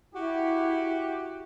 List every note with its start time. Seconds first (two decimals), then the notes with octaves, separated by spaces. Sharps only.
0.14 E4 F#4 G4